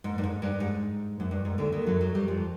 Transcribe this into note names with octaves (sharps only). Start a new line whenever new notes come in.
G#2
G2
G#2
G2
G#2
F#2
G2
G#2
D2 D3
D#2 D#3
F#2 F#3
F#2 F#3
G2 G3
F2 F3